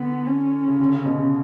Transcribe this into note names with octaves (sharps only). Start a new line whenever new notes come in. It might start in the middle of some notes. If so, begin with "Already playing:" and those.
Already playing: D3 B3
C#4
C#3
D3
C#3
B2
C#3